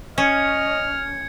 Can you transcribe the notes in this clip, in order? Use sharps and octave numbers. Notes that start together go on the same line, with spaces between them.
C#4 D#5 F6 G#6 C#7